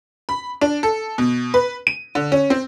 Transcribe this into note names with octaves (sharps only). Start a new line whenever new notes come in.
B5
D4
A4
B2
B4
D#7
D3
C#4
C4